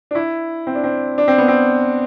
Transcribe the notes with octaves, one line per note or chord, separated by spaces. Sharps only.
D4
E4
C4
D4
C4
D4
C4
B3
C4